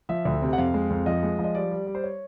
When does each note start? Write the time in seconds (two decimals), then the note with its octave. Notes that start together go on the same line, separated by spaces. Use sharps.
0.09 F3 E5
0.25 D2
0.42 C3
0.53 F#5
0.58 F2 F5
0.74 G#3
0.90 F2
1.06 F3 D#5
1.23 G#3
1.39 F3
1.44 D#5
1.55 G3 D5
1.72 G3
1.87 G3
1.95 C5
2.04 C#5